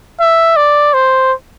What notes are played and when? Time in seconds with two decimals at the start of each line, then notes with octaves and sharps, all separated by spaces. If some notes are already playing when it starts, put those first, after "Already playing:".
0.20 E5
0.57 D5
0.94 C5